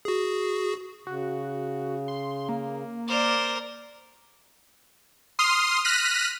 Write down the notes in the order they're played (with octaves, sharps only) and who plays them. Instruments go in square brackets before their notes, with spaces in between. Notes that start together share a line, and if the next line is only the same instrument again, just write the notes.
[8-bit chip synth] F#4 G#4
[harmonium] C#3 [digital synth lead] F#4
[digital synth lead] C6
A#3
[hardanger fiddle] A#4 C5 [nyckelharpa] D5
[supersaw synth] C6 D#6 F6 C7
F6 F#6 A#6 B6 D#7